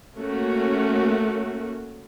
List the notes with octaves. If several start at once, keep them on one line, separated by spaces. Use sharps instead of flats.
A3 A#3 C#4 F#4